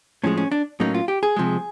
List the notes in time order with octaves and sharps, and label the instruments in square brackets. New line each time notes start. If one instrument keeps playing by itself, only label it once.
[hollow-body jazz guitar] A2 F3 G#3 C#4
C#4
D4
A2 F#3 A#3 C#4 D#4
F4
G4
G#4
C3 F3 G#3